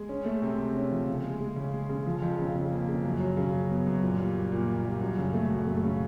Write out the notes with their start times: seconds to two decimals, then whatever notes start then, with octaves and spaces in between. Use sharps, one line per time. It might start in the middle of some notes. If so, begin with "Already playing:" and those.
Already playing: G#3
0.09 C#4
0.25 A3
0.42 C3
0.58 C3
0.74 C#4
0.91 F3
1.07 C#3
1.24 G#3
1.41 G#3
1.56 C#3
1.74 G#3
1.89 C#3
2.06 F3
2.22 F2
2.38 C#3
2.56 C#3
2.71 A#3
2.88 C#3
3.04 F#2
3.20 F#3
3.37 C#3
3.53 F#3
3.70 B3
3.87 F#2
4.02 A#2
4.20 G3
4.36 A#3
4.52 A#2
4.68 A#2
4.85 G3
5.01 F#2
5.18 C#3
5.34 A3
5.50 F#2
5.67 A3
5.83 C#3